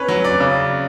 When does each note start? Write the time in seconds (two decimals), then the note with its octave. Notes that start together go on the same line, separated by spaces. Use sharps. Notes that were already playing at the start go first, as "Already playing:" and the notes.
Already playing: C#4 B4 C#5
0.08 F#3
0.25 D5
0.40 C#3